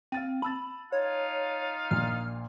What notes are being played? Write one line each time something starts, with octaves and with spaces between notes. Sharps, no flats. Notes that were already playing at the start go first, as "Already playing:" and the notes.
C4 F5 A6 D#7
A5 B5 E6 A6
D#4 F4 C#5 F5
A#1 A#2 F6 C7